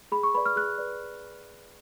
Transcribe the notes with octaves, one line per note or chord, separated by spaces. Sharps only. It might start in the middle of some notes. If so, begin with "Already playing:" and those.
G#4 B5
C#6
B4 D5 B5
F6
G#4 F#6
B4 D5